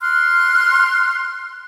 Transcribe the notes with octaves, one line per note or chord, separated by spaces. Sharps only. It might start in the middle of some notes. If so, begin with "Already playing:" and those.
C6 F6 F#6